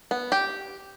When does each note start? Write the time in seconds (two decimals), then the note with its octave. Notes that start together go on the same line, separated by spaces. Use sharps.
0.11 B3
0.32 G4